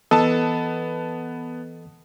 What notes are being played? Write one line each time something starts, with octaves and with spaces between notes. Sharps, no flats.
E3 B3 A4 D#5 A5